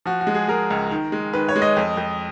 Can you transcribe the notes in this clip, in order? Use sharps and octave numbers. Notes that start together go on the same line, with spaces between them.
F3 F#4
F#4
G#3
G#4
G#3 A#4
C#2
D#3
G#3
D#3 B4
C#5
G#3
D#5
F2
F2